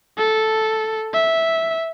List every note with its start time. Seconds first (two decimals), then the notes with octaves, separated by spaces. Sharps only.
0.18 A4
1.14 E5